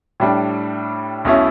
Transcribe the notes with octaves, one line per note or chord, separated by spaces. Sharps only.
A2 G3 D4
B1 B2 A3 C#4 E4